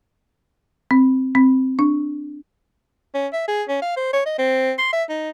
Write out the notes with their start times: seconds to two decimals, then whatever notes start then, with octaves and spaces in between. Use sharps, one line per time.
0.91 C4
1.35 C4
1.79 D4
3.14 C#4
3.33 E5
3.48 G#4
3.69 C#4
3.82 F5
3.97 C5
4.13 C#5
4.26 D#5
4.39 C4
4.79 C6
4.93 E5
5.09 D#4